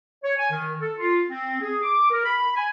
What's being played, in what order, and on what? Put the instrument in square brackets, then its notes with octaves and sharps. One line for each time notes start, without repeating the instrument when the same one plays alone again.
[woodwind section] C#5
G#5
D#3
A4
F4
C4
G#4
D6
A#4
B5
G#5